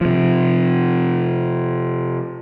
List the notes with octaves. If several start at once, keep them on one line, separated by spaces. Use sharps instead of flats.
C3 F3